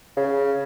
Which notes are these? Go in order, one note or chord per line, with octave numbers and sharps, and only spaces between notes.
C#3